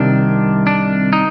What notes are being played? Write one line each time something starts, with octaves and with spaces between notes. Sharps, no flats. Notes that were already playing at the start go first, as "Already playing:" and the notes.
Already playing: C2 C3 D#3 D4
D4
D#4